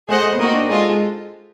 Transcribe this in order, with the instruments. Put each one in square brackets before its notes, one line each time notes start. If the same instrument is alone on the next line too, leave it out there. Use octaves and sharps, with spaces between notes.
[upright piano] A3 [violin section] G#4 C5 D#5 F#5
[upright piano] A3
B3
[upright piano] A#3 [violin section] C4 D#4 F#4 A#4 D#5
[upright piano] D4
[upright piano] G#3 [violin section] F4 A4 C5 D#5 G#5
[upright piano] G#3